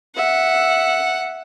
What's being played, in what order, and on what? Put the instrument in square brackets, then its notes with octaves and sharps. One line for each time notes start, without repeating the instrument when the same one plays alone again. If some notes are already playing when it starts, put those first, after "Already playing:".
[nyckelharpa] E5 [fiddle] F#5